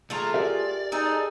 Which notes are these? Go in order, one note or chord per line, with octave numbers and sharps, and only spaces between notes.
E2 A3 F4 G#4 A#5
G4 A#4 D5 E5
D#4 G#4 A4